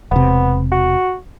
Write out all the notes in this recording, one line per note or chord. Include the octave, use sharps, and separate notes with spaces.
E1 C3 B3
F#4